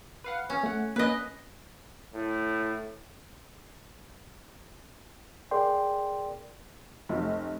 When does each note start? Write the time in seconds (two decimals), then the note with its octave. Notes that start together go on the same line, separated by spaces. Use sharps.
0.24 B4 F5 F#5
0.50 C#4
0.64 A3 F#5
0.96 A#3 C#4 B4 D#5
2.14 A2
5.51 G#4 A#4 D5 G5 C6
7.09 F1